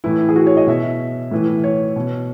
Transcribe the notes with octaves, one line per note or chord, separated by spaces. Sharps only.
A2 E3 E4
G#4
F#4
C#5
D#5
B2 E5
A2 E3
C#5
B2